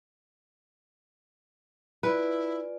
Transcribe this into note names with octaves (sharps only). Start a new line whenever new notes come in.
E4 F4 B4 D5 G#5